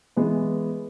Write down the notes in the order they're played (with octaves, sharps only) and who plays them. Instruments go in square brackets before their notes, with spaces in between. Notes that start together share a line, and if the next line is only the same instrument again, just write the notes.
[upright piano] E3 G#3 B3